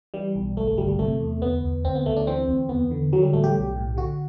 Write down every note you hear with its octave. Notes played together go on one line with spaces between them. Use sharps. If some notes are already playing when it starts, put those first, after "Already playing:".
E3 G3
B1
G1 A3
A3
G1 G3
G3
C3 A3
E2
D2 B3
D2
D2 C4
B3
D2 A3
D4
E3 C4
D2
E2 B3
D3
D3 F#3
G3
A1 A3
G4
B1
A2
D3 F#4